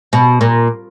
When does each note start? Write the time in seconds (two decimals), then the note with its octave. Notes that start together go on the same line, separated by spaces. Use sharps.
0.13 B2
0.41 A#2